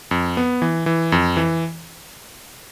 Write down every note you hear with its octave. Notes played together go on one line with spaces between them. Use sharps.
F2
B3
E3
E3
F2
E3